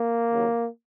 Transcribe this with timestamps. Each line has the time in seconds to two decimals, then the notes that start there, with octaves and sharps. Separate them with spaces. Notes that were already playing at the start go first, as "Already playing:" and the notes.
Already playing: A#3
0.31 D#2 C#3 F#3